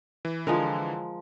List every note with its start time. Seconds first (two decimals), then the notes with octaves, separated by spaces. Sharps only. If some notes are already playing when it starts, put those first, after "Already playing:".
0.25 E3
0.47 D3 E3 F3 G#3 A#4